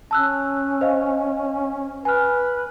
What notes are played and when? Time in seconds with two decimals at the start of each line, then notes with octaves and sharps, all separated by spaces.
0.11 C#4 A5 E6 F#6
0.81 C5 D#5 F5
2.05 B4 G#5 F6